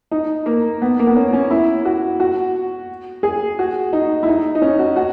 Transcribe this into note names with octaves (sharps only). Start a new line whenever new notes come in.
D#4
A#3
B3
A#3
B3
C#4
C#4
E4
F#4
F#4
G#4
F#4
D#4
E4
D#4
D#4
C#4
F#4
F#4